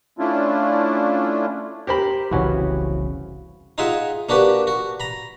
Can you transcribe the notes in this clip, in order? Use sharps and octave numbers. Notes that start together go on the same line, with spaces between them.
A3 C#4 D4 E4 F4
G4 A#4 C5 B5
F1 C2 C#3 E3 B3 C#4 F#4
D#4 F4 G#4 E5 F#5
A#3 D4 F#4 G4 B4
F#4
A#5 B5